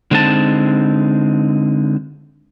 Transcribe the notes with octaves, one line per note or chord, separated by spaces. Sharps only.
D3 G#3 C4 D#4 G4 A5